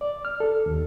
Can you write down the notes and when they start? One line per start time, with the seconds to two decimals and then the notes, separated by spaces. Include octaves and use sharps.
0.01 D5
0.25 F6
0.40 A4
0.66 D#2